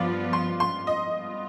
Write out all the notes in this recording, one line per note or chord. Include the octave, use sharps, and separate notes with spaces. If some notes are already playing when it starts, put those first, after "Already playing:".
Already playing: G2 F3 B3 F4 D5 F5
C6
C6
D#5
G3 B3 F4